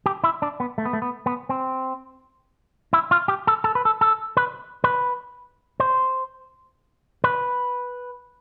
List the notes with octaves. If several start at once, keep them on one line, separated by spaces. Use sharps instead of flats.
G4
E4
D4
B3
A3
B3
A3
B3
B3
C4
E4
F4
G4
A4
A4
B4
A4
A4
B4
B4
C5
B4